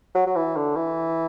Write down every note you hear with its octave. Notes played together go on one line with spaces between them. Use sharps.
F#3
F#3
E3
D3
E3